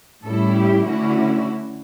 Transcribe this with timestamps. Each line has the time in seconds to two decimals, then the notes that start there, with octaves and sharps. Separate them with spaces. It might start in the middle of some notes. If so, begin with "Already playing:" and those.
0.24 A2 G3 C#4 E4 A4
0.54 G4
0.84 D3 A3 C#4 E4 F#4